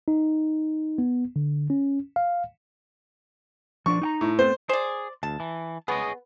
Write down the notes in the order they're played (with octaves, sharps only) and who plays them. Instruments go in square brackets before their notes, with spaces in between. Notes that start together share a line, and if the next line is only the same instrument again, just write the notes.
[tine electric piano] D#4
B3
D3
C#4
F5
[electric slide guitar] F3 D4 D5 [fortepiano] C#6
[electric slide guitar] D#4 G5 A#5
[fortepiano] A2
[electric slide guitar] A3 B3 C4 [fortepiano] C5
[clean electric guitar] G#4 [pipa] C5 D5
[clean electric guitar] D2 [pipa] A5
[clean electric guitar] E3
[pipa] B3 [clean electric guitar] G#4 C#5 D#5